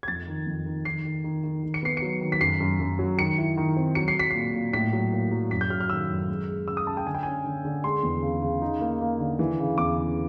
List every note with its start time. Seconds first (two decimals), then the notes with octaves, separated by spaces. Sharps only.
0.03 G#6
0.08 F2 A6
0.27 D#3
0.46 F2
0.66 D#3
0.85 D#3 C7
1.05 D#3
1.24 D#3
1.44 D#3
1.63 D#3
1.74 C#7
1.83 B3 C7
1.97 F#3 C#7
2.21 D#3
2.32 B6
2.41 F#2 C7
2.60 F#2
2.79 F#2
2.99 F#3
3.18 D#3 C#7
3.38 E4
3.57 D#3
3.76 C4
3.95 F#3 C#7
4.08 C7
4.15 F#3 B6
4.31 A#2 C7
4.55 A#2
4.73 A2 B6
4.93 F#3
5.13 A#3
5.31 F#3
5.51 F#2 B6
5.61 G6
5.70 F#3 F6
5.81 F6
5.89 D#3 E6
6.09 F#2
6.29 G#3
6.48 G#3
6.68 C#3 E6
6.77 D#6
6.87 C#3 A5
6.97 G5
7.06 D3 G#5
7.15 G5
7.23 C#4 G#5
7.46 D3
7.65 D3
7.84 G#3 C6
8.03 E2
8.22 C#3
8.42 C#3
8.62 D#4
8.81 A#3
9.01 A#3
9.19 D3
9.39 E3
9.59 C#3
9.78 E2 D6
9.98 C#3